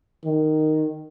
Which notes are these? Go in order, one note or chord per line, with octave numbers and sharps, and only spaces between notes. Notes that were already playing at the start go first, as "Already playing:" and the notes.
D#3